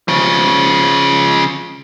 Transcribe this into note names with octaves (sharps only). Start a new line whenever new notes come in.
C#3 F3